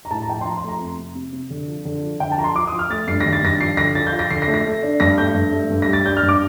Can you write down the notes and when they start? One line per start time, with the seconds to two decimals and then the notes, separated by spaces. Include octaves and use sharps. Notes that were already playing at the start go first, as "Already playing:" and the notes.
0.05 A#5
0.11 A2 A5
0.22 A#5
0.28 F3 G5
0.34 A5
0.41 C6
0.45 F3 A#5
0.58 C6
0.63 A3
0.69 A#5
0.80 F2
0.98 C3
1.15 C3
1.33 C3
1.50 D3
1.68 F3
1.85 D3
2.03 F3
2.20 D3 G5
2.32 A5
2.38 F3 A#5
2.44 C6
2.55 F3 D6
2.67 D#6
2.72 F3
2.79 F6
2.90 A3 A6
3.08 G2 C7
3.21 D#3 A#6
3.33 A6
3.43 G2 A#6
3.60 F3 C7
3.77 D3 A#6
3.95 F3 A6
4.07 G6
4.13 F4
4.19 A#6
4.30 D3 C7
4.42 A#6
4.48 A3
4.54 A#6
4.65 A3
4.83 D4
5.00 G2 A#6
5.18 A3 G6
5.34 G2
5.52 A3
5.70 G2
5.82 A#6
5.87 G3
5.93 A6
6.06 D4 G6
6.17 F6
6.23 G2
6.29 D6